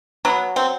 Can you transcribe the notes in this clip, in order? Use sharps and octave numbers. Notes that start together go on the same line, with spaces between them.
F#3 B3
C4